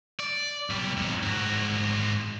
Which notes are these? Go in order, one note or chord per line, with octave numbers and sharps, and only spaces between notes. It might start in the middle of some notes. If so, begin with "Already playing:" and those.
D5
B1 G3
F2 A#2
G#2 F#4